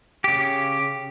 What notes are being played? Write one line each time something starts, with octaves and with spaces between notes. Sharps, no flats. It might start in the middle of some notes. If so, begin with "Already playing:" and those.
C#3 G4